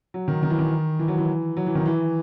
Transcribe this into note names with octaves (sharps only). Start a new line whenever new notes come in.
F#3
D#3
D#3
E3
D#3
E3
F#3
E3
F#3
E3
D#3
E3